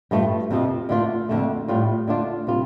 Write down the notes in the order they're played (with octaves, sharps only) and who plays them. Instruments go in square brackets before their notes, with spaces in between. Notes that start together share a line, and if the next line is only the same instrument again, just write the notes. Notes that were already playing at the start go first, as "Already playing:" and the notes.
[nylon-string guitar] G2 F3 A3
F2 C3 F3
D3 A3 F4
F2 D3 A3
A2 G3 F4
D3 A3 D4 F4
C3 G3 F4